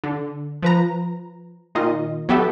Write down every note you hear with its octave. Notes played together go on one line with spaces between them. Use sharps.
D3
F3 B4 A#5
A#2 D#3 F4 D#5
F#3 B3 G4 A4 E5